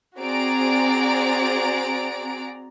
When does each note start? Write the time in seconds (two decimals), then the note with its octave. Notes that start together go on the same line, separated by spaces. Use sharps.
0.18 C4 F#4 G#4 D5 A#5 D7